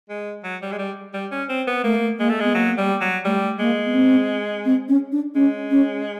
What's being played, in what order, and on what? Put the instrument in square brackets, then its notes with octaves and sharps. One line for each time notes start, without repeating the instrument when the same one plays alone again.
[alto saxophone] G#3
F#3
G3
G#3
G3
G3
C#4
C4
B3
[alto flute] A3 [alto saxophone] A#3
[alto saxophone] G#3 [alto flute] A#3
[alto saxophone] A3
[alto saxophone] G#3 [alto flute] B3
[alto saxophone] F#3 [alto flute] A#3
[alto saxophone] G3
F#3
[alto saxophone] G3 [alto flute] A3
[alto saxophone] G#3 [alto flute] A#3
[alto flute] B3
C4
C4
C#4
D4
[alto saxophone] G#3 [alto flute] C#4
[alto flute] C#4